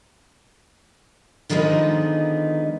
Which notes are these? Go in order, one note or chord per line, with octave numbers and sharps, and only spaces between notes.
D3 D#3 F3 G#3 B3 D#4